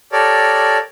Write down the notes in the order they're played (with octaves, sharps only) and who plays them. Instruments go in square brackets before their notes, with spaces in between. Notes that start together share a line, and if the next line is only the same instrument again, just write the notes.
[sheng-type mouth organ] G4 A4 A#4 C#5 D5